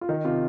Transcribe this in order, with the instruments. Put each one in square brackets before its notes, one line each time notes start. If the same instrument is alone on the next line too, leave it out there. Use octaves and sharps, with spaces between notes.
[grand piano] F4
D#3 D#4
C3 F4